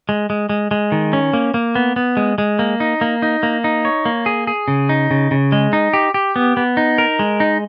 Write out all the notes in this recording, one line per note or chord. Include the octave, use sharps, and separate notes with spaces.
G#3
G#3
G#3
G#3
D#3
C#4
A#3
A#3
B3
B3
G#3
G#3
A#3
D#4
A#3
D#4
A#3
D#4
C#5
A#3
G#4
G#4
C#3
D#4
C#3
C#3
G#3
D#4
G4
G4
B3
B3
D#4
A#4
G#3
D#4